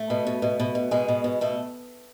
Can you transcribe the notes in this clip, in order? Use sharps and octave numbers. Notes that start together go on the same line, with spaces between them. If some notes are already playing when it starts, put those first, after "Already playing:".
Already playing: A3
B2
B2
B2
B2
B2
B2 G#3
B2
B2
B2 A3